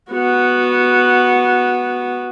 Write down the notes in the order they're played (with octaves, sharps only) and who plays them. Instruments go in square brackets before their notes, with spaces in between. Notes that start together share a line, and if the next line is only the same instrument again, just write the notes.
[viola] B3 F#4